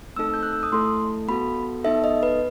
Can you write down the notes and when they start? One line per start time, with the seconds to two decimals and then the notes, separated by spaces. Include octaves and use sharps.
0.16 A3 C4 D#4 A4 E6
0.34 G6
0.43 F#6
0.53 E6
0.63 D#6
0.72 A3 E4 A4 C6
1.28 B3 F#4 A4 B5
1.84 B3 D#4 A4 E5
2.04 D#5
2.23 B4